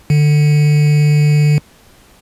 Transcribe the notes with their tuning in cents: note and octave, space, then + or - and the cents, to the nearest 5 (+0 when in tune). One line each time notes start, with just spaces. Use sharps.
D3 +20